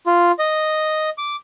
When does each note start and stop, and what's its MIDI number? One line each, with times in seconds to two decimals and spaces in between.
0.07 0.32 65
0.39 1.10 75
1.18 1.36 86